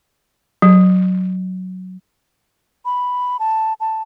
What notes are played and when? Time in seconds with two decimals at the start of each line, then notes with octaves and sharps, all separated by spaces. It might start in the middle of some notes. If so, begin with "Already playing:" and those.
0.62 F#3
2.85 B5
3.39 A5
3.80 A5